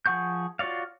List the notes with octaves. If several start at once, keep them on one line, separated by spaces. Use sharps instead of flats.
F3 G#4 F#5 C#6 G6
F4 F#4 C#5 D5 F5